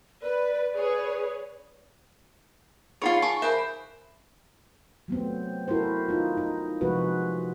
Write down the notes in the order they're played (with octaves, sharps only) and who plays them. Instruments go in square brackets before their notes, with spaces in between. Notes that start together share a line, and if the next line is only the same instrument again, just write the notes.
[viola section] B4 [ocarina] D5
[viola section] G#4 B4 C#5
[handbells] D#4 G#4 [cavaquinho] F4 C#5 [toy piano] F#5 B5 D6
[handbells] G#5 A5 [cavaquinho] C#6 [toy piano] D6
[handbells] A#4 F#6 [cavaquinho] C5 [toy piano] E5 G#5 B5
[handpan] F#3 A3 B3 C4
E4 F#4 A4 A#4 C5
D#4 F4
D#4
C3 F3 G#3 C4 F#4 B4